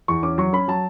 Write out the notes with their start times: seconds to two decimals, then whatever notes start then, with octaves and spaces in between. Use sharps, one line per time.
0.08 E2 C#6
0.23 C#4 D6
0.38 F#3 C#6
0.53 C#4 B5
0.68 F#3 A5